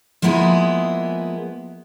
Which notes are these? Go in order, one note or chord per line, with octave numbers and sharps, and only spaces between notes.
F3 G#3 A#3 B3 E4 G#4